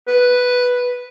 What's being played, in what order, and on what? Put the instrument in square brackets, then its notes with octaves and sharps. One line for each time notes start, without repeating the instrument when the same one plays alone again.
[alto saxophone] B4